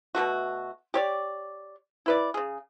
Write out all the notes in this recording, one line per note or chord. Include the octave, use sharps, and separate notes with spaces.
B2 F3 A3 F#4
G4 C#5 D5
E4 B4 D5
C#3 G#4